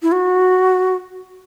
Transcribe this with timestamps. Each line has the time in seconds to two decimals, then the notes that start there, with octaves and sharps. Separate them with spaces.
0.02 E4
0.12 F#4